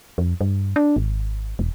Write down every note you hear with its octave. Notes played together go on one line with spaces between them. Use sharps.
F2
G2
D4
G#1
E1